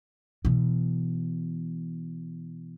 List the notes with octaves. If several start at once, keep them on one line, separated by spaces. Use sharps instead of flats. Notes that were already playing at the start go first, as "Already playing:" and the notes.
B2 E3